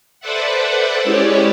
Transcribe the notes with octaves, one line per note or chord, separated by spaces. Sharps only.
A4 B4 C5 D5 E5 F#5
G#3 C#4 E4 G4 C#5 D5